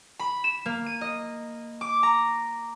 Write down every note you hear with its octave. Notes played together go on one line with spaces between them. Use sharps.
B5
E7
A#3
D#7
D#5
D6
A#5